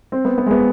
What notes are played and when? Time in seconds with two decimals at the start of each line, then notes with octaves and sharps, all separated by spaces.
0.12 C4
0.25 B3
0.38 B3
0.46 G#3
0.51 B3